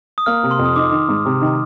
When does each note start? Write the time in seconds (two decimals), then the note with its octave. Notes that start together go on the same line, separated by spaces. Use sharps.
0.18 D#6
0.26 A#3 F6
0.43 C3
0.51 C6
0.59 F2
0.65 D#6
0.76 D#4 D6
0.92 D#3
1.09 G#2
1.25 C3
1.41 D#3